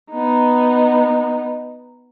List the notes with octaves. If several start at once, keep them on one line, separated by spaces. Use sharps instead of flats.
B3 D#4